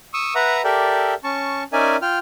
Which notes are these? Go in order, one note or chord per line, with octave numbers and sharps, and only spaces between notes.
C#6 D#6 E6
B4 E5 F#5 A#5
G4 A4 A#4 D5 E5 G5
C#4 A5 C#6
C#4 D#4 A#4 D5 E5 G#5
F4 G5 F6